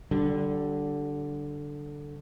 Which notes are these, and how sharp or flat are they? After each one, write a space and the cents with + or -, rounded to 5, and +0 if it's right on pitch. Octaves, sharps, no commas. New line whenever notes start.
D3 +0 G3 -30